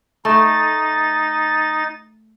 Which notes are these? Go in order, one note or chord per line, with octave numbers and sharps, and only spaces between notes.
A3 D#4 A6